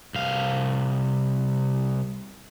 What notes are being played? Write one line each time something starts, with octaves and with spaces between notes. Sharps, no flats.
C2 F5